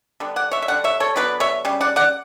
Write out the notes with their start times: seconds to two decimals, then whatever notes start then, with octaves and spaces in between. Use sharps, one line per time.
0.20 D3 G3 B3
0.36 D5 F#5
0.51 C#5 E5
0.62 E5
0.68 D3 G3 F#5
0.84 C#5 E5
1.00 A4 C#5
1.16 D3 F#3 B3 B4 D5
1.40 C#5 E5
1.65 C#3 G3
1.81 D5 F#5
1.96 D5 F#5